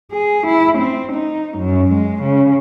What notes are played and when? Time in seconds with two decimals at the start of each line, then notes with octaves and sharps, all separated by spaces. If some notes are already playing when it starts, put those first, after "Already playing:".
0.12 G#4
0.47 E4
0.78 C4
1.12 D#4
1.58 F#2
1.92 G#3
2.23 C#3